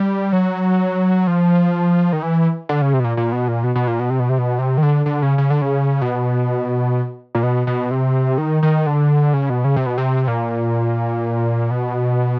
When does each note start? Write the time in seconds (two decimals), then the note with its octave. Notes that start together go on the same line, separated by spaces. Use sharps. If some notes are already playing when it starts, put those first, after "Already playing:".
Already playing: G3
0.32 F#3
1.27 F3
2.13 D#3
2.22 E3
2.69 D3
2.82 C#3
2.94 C3
3.00 B2
3.04 A#2
3.17 A#2
3.32 B2
3.48 A#2
3.64 B2
3.75 B2
3.87 A#2
3.99 B2
4.10 C3
4.20 B2
4.29 C3
4.38 B2
4.59 C3
4.78 D#3
4.83 D3
5.06 D3
5.22 C#3
5.38 C#3
5.50 D3
5.62 C#3
6.02 B2
7.35 A#2
7.43 B2
7.67 B2
7.91 C3
8.38 D#3
8.63 D#3
8.86 D3
9.33 C#3
9.50 B2
9.64 C#3
9.76 C3
9.86 B2
9.98 C3
10.28 A#2
11.71 B2